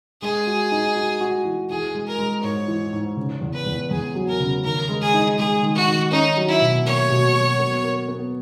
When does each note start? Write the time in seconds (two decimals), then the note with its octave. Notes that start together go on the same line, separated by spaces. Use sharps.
0.22 G#3 G#4
0.47 F#4
0.72 D#4
0.96 F#4
1.21 F#4
1.45 E3
1.70 E3 G#4
1.94 G#3
2.07 A#4
2.19 G#3
2.43 G#2 C#5
2.68 E3
2.93 G#2
3.17 C#3
3.41 E2
3.54 B4
3.66 E2
3.91 E2 G#4
4.15 F#3
4.27 A#4
4.40 C#3
4.64 D#3 A#4
4.89 G#3
5.02 G#4
5.14 D#4
5.38 G#3 G#4
5.63 D#3
5.76 F#4
5.87 D#3
6.11 C#4 D#4
6.37 F#3
6.48 E4
6.61 B2
6.86 A#3 C#5
7.10 B2
7.35 F#3
7.59 B3
7.84 A#4
8.08 B3